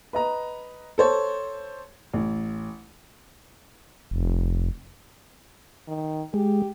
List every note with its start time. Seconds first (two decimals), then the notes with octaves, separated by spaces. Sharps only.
0.13 B4 D#5 A#5
0.98 A4 C5 C#5
2.14 A1
4.11 F1
5.88 D#3
6.34 G#3 G4